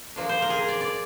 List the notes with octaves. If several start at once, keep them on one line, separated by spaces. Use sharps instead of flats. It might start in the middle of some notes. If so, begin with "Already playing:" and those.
F3 A#3 D4
C5
A#4
G#4
A#4
D5
D5